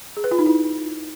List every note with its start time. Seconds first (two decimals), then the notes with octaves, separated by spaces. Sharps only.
0.17 G#4
0.24 B4
0.31 F4
0.39 D#4
0.46 E4